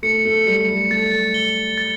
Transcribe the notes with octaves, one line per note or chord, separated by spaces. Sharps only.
A3 C#7
A3
G3 C#7
A3
A3 A6
G7
A6